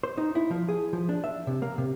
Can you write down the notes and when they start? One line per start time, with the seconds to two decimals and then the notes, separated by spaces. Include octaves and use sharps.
0.03 C5
0.18 D#4
0.35 E4
0.51 F3
0.69 G#4
0.93 F3
1.09 D4
1.24 E5
1.47 C3
1.62 A#3
1.78 C3